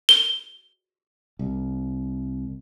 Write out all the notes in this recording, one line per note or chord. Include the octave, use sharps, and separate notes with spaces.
G7
C2